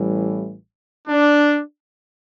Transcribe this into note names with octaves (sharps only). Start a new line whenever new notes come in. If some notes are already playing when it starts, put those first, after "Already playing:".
Already playing: A1 A2 E3 G3
D4